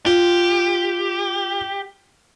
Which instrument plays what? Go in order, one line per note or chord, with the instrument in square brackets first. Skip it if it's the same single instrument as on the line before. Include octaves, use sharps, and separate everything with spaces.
[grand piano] F4 [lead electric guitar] G4